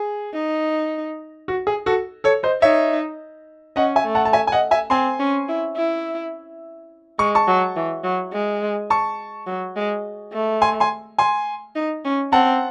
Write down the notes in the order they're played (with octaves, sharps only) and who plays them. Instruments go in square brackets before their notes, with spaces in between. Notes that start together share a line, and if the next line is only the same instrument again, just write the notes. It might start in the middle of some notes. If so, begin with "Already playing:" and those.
Already playing: [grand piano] G#4
[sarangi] D#4
[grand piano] F#4
G#4
F#4 A4
A4 C#5
C5 D#5
[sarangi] D#4 [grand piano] C#5 E5
[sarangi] C#4 [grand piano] D#5 F#5
[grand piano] E5 G#5
[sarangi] A3
[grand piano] F#5 A5
A5
E5 G#5
G#5
D#5 F#5
E5 G#5
[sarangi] C4 [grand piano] G#5 C6
[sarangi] C#4
E4
E4
[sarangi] G#3 [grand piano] C#6
[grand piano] A5 C#6
[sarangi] F#3
E3
F#3
G#3
[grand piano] A5 C#6
[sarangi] F#3
G#3
A3
[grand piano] G#5 C6
G#5 C6
G#5 C6
[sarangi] D#4
C#4
[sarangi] C4 [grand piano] F#5 A5